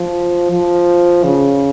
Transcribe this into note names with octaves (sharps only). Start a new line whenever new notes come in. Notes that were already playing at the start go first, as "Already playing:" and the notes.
Already playing: F3
F3
C#3